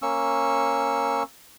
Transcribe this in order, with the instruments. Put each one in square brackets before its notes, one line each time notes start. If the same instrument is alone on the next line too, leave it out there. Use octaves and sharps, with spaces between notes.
[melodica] A#3 C#4 C#6 E6